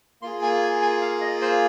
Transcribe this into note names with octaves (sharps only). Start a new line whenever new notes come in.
A#3 F4 G#4 C6
G#5
G#5
G#5
F5
D#5
C5